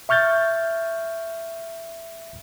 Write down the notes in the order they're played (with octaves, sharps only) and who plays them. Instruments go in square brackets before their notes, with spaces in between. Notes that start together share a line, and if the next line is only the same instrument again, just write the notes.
[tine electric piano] E5 C#6 F6 G6 A6